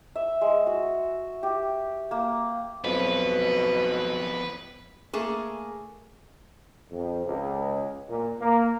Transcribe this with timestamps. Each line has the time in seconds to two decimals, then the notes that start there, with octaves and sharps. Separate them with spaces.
0.16 E5
0.41 G#3
0.67 F#4
1.43 G4
2.11 A#3
2.84 B1 F2 B2 F3 B3 B4
5.13 A3 A#3 G#4
6.91 F2
7.25 C#2
8.07 A#2
8.40 A#3